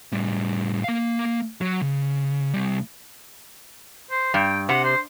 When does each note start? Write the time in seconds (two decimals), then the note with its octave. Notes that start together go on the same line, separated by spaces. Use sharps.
0.12 A2 G3
0.84 A#3 F5
1.61 F#3
1.82 C#3
2.54 C2 G3
4.11 C5
4.34 G2 G5
4.69 C3 F#5
4.84 C5